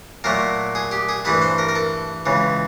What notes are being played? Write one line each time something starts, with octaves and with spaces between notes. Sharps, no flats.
A#2 F#3 A3 A#4
G#4
G4
G#4
G2 E3 A3 B4
C5
A#4
A#4
A4
C#2 C#3 E3